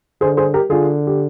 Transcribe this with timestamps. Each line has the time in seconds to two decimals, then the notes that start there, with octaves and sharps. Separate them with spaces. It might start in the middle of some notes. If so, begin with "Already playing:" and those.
0.21 D3 G#4 C5
0.37 G#4 C5
0.54 G4 A#4
0.70 D3 F4 G#4
1.07 G4